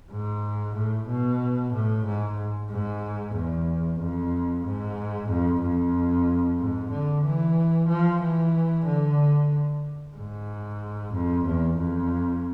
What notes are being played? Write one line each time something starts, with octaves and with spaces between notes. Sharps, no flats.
G#2
A2
B2
A2
G#2
G#2
E2
F2
G#2
F2
F2
G#2
D3
E3
F3
E3
D3
G#2
F2
E2
F2